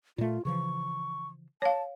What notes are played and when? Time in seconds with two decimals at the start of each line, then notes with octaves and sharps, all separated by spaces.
0.18 A#2 A3 F4
0.45 C#3 E3 F3 C#6
1.62 C#5 F5 A5